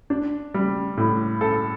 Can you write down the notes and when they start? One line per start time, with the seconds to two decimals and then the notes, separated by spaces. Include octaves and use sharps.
0.10 D4
0.54 G3
0.97 A2
1.41 A4